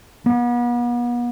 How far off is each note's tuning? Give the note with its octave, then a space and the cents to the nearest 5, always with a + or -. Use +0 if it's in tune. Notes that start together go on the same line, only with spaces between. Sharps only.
B3 -40